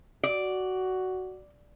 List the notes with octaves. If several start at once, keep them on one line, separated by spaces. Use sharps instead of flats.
F#4 D5